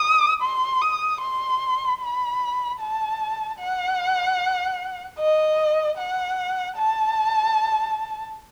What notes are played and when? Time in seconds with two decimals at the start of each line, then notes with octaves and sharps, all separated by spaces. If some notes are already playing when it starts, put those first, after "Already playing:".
Already playing: D#6
0.42 C6
0.81 D#6
1.21 C6
2.01 B5
2.80 A5
3.59 F#5
5.19 D#5
5.97 F#5
6.77 A5